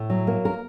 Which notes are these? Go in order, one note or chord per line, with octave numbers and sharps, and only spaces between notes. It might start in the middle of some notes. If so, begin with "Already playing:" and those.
Already playing: A2
F#3
A#3
A#4